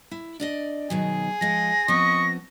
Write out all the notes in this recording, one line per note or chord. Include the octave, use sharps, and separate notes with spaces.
E4
D4 D5 D#5
B2 D#3 F#3 G#4
F3 G#3 F4 A#6
F3 B3 C4 D#5 C#6